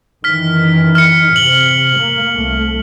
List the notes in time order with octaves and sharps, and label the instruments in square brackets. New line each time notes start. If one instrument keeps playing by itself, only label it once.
[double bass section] F#2 D#3 E3 [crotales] F6 B6
[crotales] F6 C#7
[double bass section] C3 [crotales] F#7 G7
[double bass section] A#3
C2 A3